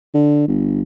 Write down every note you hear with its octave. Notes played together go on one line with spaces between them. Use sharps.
D3
G1